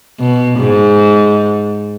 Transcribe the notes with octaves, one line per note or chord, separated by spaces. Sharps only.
B2
G#2